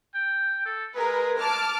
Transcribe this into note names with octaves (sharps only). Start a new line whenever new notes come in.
G5
A4
G#3 G#4 A#4 B4
A5 D6 F6